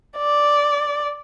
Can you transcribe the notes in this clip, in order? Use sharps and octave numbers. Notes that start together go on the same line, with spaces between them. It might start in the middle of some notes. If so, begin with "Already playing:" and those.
D5